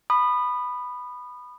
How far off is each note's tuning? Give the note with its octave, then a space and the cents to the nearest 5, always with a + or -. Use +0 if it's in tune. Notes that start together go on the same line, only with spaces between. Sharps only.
B5 +0 D#6 -30